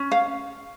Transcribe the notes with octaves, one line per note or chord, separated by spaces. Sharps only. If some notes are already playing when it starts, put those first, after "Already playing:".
Already playing: C#4
F5